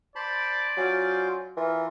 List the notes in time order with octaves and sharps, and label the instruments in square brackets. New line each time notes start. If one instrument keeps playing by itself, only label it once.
[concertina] C5 A5 B5 [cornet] D5
[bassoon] F#3 [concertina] C#4 F4 C5
[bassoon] E3 [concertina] F4 A#4